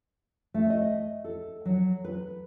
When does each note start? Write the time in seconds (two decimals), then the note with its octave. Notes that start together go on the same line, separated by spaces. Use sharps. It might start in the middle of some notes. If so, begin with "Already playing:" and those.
0.54 A3
0.70 D#5
1.24 A4
1.65 F#3
2.04 B4